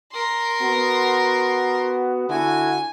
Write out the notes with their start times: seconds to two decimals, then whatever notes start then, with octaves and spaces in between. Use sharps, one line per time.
0.12 A#4 C6
0.62 B3 F#4
2.30 D3 E4 F#4 G#5